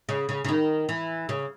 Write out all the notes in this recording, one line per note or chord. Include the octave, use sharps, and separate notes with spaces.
C#3
C#3
C#3
D#3
E3
C#3